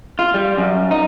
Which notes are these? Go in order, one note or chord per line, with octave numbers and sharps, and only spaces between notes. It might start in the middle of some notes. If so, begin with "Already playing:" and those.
F4
G3
F#2
D#4